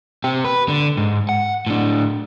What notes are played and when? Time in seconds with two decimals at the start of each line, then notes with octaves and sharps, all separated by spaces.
0.24 C4 G4
0.45 B4
0.68 D3
0.97 G#2
1.29 F#5
1.67 A2 D4